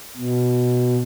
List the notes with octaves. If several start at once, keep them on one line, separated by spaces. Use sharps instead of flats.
B2